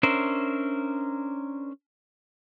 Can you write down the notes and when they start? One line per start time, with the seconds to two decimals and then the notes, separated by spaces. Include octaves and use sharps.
0.03 C#4 D4 A#4 C5 E5